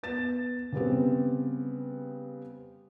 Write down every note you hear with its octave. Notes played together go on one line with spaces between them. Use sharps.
B3 A6 E7
C#3 G3 B3 C4